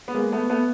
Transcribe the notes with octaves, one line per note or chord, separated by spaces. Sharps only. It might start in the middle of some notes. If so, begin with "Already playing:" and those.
B3
G#3 A#3
A3 B3
A3 B3